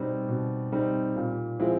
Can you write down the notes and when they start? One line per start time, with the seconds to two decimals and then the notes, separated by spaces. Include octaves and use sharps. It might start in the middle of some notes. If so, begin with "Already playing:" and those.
Already playing: B2 G3 C4 D#4
0.29 B2
0.72 G3 C4 D#4
1.16 A#2
1.59 F3 G#3 C4 E4